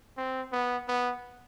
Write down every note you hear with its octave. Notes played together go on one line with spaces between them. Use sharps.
C4
B3
B3